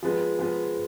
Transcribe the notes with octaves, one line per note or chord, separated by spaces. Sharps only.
F3 G#3 B3
F3 G#3 B3